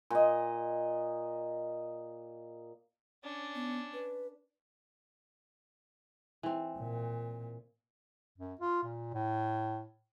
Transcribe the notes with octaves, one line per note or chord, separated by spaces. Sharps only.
A#2 D#5
C#4 D4
B3
B4
E3 C4
A#2
F#2
F4
A#2
A2